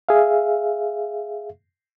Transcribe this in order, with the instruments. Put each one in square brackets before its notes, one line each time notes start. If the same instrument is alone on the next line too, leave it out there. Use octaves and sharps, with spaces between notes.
[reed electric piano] G#4 E5 F5